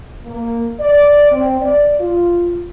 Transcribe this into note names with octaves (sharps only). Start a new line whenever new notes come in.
A#3
D5
C4
D5
F4